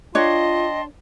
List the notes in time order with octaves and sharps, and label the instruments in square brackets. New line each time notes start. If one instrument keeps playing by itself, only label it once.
[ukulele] D4 C#5 [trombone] F4 [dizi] D#5 [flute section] G5 A5 C6